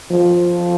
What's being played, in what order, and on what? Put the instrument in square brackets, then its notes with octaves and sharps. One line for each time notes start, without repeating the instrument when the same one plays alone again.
[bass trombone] F3